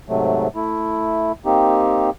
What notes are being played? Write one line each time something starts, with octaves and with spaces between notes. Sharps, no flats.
G#2 C3 F#3 A3
A3 E4
A#3 C4 D#4 G4